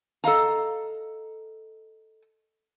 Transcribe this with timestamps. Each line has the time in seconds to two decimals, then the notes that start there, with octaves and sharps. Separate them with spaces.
0.24 A4 D#5 F5 A#5